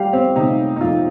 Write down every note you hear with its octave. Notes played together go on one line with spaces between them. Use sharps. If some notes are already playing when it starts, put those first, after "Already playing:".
Already playing: G3 G4 F5
C4
C3 D#4
D#4
F2 F4